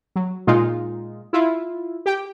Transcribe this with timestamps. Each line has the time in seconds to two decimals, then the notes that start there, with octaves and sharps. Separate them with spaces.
0.16 F#3
0.47 A#2 G#3 D#4 F4
1.33 E4 F4
2.06 G4 G5